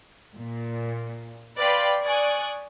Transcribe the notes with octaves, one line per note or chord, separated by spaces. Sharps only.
A#2
B4 D5 F5 G5 B5 C6
D5 G#5 C#6 D#6 F#6 G#6